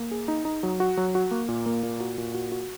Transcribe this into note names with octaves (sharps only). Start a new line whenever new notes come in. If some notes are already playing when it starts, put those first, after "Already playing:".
Already playing: A#3
G#4
D#4
D#4
F#3
F#4
F#3
F#4
A#3
A#2
A#3
A#2
F#4
A#2
F#4
F#4